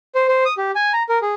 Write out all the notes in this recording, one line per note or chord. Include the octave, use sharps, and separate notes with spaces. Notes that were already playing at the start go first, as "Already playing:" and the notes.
C5
C5
D#6
G4
G#5
A#5
A#4
G#4